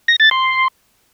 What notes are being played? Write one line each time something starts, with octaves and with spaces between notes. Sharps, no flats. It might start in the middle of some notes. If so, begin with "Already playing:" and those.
A#6
A6
C6